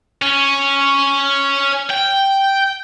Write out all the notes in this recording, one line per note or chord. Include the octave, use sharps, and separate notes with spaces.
C#4
G5